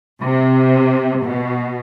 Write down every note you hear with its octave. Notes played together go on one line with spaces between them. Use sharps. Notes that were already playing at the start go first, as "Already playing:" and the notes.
C3
B2